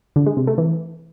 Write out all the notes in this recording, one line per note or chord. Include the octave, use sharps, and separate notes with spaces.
D3
G#3
C3
A3
E3